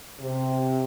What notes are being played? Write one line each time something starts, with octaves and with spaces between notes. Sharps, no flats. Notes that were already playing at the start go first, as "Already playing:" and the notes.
C3